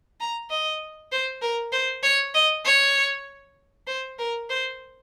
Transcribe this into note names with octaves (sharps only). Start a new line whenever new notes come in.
A#5
D#5
C5
A#4
C5
C#5
D#5
C#5
C5
A#4
C5